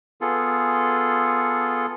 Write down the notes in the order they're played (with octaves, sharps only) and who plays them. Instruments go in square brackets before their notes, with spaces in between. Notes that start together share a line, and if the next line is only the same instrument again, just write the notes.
[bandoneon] B3 F4 G#4 A4